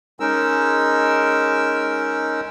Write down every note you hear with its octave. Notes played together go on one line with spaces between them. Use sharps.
G#3 C#4 D#4 A#4 E6